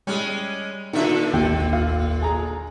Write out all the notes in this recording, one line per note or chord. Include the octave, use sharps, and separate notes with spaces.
G3 G#3 C#4
A#2 D3 D#3 D4 E5
G#1 D#2 G5
F5
G#4 A#5